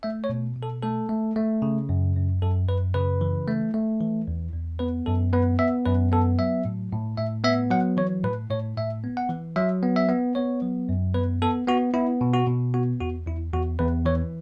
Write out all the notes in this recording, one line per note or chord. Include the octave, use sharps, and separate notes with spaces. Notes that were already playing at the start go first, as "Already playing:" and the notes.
A3 E5
C#5
B2
B2
A4
A3 A4
A3
A3
C#3
F#2
F#2
F#2 A4
F#2 B4
C#3 B4
E3
A3
A3
E3
E2
E2
B3 B4
F#2 A4
B3 B4
B3 E5
F#2 B4
B3 A4
F#3 E5
A2
A2
A2 E5
B3 E5
F#3 F#5
E3 C#5
A2 B4
A2 C#5
A2 E5
B3
F#5
E3
F#3 E5
B3
E5
B3
B3 C#5
F#3
F#2
B3 B4
B3 A4
B3 F#4
B3 E4
B2
F#4
B2
B3 F#4
E2 F#4
E2 E4
E2 F#4
E2 B4
E3 C#5